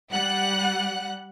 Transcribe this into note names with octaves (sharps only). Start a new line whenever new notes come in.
G3 F#5 F#6